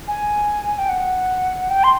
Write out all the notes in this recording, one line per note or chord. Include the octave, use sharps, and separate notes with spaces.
G#5
G5
F#5
G5
C6